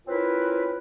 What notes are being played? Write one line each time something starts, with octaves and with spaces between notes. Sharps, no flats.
C4 C#4 E4 F4 A#4 B4